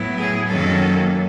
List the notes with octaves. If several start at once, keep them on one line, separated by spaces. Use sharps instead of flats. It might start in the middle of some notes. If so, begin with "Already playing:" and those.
Already playing: A2 F#3 B3 E4
G#4
F#2 D#3 F#3 A#3 C#4 A4